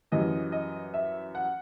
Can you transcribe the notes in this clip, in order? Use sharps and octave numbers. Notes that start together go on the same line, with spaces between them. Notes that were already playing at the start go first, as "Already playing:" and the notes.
F#2 E3 G3 D#5
D#5
E5
F#5